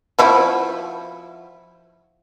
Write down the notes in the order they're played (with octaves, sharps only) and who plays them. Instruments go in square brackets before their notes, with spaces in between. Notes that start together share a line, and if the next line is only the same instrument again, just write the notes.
[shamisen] F3 E4 F#4